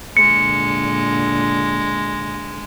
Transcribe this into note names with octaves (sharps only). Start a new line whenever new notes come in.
A#2 D3 G#3 C#7